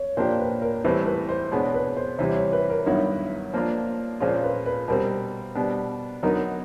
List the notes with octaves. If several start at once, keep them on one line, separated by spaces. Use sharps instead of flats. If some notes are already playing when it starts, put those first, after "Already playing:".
Already playing: C#5
A#2 F3 A#3 D4 G4 C5
B4
A#4
A2 E3 G3 C4 B4
B4
C5
B2 G#3 B3 D4 C#5
B4
C5
C3 E3 G3 C#5
C#5
B4
A#4
G2 D#3 F#3 B3 E4 C#5
F3 A#3 D4 F4
A#2 F3 G#3 C#4 F4 C5
B4
B4
B2 G3 C4 A#4
B2 G3 B3 D4
D3 F#3 B3 D#4 A#4